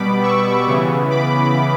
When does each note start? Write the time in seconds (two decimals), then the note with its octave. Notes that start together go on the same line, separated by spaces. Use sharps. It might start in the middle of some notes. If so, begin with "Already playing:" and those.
Already playing: B2 G3 B3 B5 D6
0.23 C#6 E6
0.67 C#3 E3 B3
1.11 B5 D6